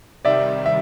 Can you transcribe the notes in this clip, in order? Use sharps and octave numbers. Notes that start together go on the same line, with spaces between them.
C3 D#3 G3 D5 E5
E5